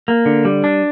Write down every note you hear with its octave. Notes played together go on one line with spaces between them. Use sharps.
A#3
D3
G3
D4